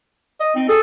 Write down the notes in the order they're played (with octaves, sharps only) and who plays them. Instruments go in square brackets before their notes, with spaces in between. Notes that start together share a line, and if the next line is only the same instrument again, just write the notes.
[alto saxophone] D#5
[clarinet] C4 [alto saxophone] D#4
[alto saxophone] G#4 [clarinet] A4